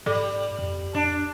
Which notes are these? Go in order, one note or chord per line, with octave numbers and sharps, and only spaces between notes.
G#2 G3 A4 D5 D6
F2
F2 D4